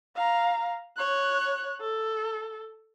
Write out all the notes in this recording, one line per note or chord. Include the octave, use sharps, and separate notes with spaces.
F5 A#5
C#5 F#6
A4